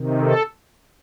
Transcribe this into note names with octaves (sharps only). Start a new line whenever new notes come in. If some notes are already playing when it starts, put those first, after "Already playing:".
Already playing: C3 D#3
A4